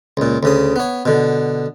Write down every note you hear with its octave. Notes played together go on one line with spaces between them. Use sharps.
C#2 A#2
D2 C#3 D#6
B3 C#5
B2 D3